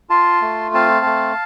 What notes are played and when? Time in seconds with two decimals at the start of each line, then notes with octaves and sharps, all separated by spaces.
0.10 F4 A5 C6
0.42 A3
0.74 C4 F5 A5
1.06 A3